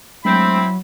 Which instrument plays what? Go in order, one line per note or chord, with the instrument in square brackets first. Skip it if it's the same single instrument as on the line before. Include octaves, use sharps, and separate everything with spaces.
[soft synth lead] F#3 [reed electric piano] G#3 A3 D4 [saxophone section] C4 [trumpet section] E4 B5